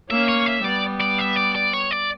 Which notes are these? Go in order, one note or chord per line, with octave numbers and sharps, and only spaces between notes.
A#3 C#4 E5
C#5
E5
G3 B3 D5
D5
E5
D5
D5
C#5
D5